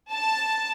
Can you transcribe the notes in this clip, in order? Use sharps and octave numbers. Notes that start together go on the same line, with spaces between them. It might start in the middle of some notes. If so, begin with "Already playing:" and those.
A5